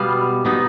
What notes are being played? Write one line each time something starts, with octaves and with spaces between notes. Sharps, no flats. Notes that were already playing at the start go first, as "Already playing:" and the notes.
Already playing: B2 G3 B3 F5
B2 B3 D#4